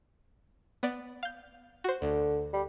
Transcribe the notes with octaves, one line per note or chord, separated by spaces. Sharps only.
B3 D5
F5 G6
F#4 C5
D2 D3
G3